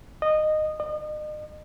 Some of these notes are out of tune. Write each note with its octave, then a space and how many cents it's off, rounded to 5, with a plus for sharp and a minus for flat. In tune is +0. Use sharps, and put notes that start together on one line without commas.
D#5 -15
D#5 -40